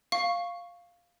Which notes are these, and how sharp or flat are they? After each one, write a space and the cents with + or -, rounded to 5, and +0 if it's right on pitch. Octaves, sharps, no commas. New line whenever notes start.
F5 +0 C#6 +0